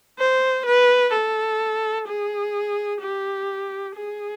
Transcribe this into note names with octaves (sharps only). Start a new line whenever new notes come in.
C5
B4
A4
G#4
G4
G#4